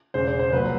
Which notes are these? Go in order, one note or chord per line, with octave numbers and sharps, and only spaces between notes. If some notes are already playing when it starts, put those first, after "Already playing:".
E1 E2 C#3 C5
C5
C5
C2 A#2 F#3 B4